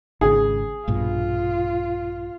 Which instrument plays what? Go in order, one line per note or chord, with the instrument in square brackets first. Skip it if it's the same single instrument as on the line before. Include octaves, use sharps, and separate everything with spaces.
[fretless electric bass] G#1 C#3 [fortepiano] G#4
[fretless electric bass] A#1 G2 B2 [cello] F4